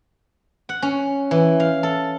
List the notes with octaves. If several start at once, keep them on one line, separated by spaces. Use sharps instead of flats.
F#5
C#4
E3
F5
A4